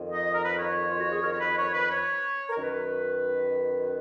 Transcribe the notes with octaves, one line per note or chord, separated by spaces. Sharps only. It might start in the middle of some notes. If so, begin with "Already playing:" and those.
Already playing: F2 D#3
D#5
A#4
B4
C#5
F4
F#4
G#4
A#4
C#5
B4
C#5
B4
C#5
A#4
F#2 D#3 B4